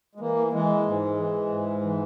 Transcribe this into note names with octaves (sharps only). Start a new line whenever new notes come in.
G#3
E3 A#3
E3 G#3
G#2
E3
G#2
E3